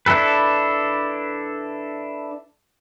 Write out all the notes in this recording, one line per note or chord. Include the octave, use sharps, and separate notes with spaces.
D4 E4 A4 B4